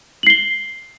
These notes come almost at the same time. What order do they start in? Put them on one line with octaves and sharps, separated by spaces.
F#7 C7 G7